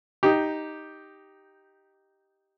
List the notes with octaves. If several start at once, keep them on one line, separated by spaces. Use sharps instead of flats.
D#4 G4